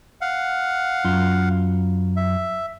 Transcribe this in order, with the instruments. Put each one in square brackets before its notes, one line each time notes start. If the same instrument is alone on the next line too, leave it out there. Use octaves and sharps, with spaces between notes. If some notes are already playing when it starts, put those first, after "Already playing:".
[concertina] F5 F#5
[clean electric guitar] F#2 F4
[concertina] E5